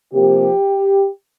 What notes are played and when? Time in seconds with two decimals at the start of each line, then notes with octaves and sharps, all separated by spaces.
0.12 C3 F3 A#3 G4